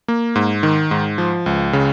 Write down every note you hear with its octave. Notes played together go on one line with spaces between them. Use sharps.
A#3
G#2
D#3
G#2
F3
C#2
C#3